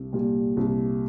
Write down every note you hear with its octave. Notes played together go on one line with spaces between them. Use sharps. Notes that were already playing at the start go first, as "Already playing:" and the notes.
Already playing: C2
A#2 G3
C2